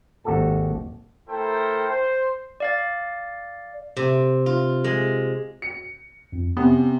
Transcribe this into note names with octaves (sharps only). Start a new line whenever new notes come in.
G#1 D#2 F#4 G4 A4 A5
A3 E4 A4 A#4 C5 G5
C5
D5 F5 A6
C3
F4
G#3
C#7
F2
C3 B3 C#4